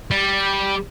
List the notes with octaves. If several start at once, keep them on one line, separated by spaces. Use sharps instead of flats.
G3